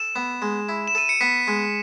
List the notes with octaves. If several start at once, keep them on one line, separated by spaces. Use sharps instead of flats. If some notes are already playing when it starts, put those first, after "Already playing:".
Already playing: A4 E7
B3
G#3
E4
E7
A4 D#7
C#7
B3 B6
G#3